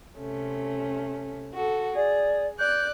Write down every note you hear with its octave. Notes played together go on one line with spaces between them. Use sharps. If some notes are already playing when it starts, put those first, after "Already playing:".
C3 A3 C#4
F#4 A4
G#4 D5
D5 F#6 G6